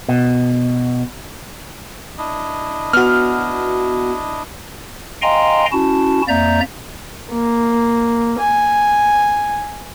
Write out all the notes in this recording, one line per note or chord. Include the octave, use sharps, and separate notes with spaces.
B2
D4 E4 D#5
B3 F#4 F6
D#5 F5 G5 G#5 A#5 C6
C#4 E4 F#4 A5
F2 A#3 D5 E5 A#5 G6
A#3
G#5